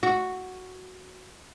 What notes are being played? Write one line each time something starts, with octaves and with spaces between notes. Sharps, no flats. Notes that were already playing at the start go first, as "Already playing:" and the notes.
F#4